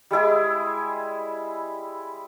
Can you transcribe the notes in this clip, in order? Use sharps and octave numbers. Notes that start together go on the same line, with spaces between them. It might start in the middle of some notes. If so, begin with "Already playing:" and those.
G3 G#3 E4 G#4